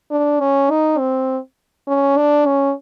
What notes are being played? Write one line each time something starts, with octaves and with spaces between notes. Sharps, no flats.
D4
C#4
D#4
C4
C#4
D4
C#4